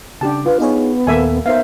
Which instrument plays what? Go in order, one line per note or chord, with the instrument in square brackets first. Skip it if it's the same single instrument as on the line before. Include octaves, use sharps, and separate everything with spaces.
[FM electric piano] C#3 [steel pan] D4 G4 A5
[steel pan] F4 [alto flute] B4
[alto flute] B3 [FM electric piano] D#4 G#4 C#5
[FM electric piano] D#2 A#2 A4 [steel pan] A#3 E5 G#5
[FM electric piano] B3 D#4 A#4 [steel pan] C5 F5 [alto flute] E5